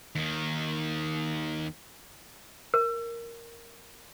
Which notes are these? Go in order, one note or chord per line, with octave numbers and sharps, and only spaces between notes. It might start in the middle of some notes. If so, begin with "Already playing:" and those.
D#2 D#3
A#4